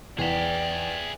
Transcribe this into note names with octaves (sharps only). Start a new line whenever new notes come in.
E2 G#4 D5 E5 G5 F7